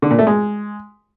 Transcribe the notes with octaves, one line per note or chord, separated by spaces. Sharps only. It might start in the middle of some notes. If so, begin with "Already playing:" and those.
D3
A#2
A3
G#3